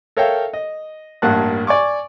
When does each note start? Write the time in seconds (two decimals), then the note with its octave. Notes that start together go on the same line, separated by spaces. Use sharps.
0.17 A4 A#4 C#5 E5 F5 G5
0.53 D#5
1.22 A1 G2 A#3 F#5 A5 F#6
1.67 D5 G#5 C#6 D6